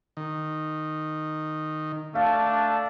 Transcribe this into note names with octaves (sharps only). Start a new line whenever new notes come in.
D#3
A3 D4 F5 A5